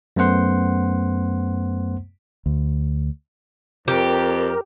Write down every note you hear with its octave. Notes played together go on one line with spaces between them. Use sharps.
F#2 A3 B3 C5 F#5 C6
D2
F2 G4 A#4